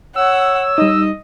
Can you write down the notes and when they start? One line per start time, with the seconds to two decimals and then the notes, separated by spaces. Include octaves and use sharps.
0.16 C#5 F#5 E6
0.78 G3 D#4 D#5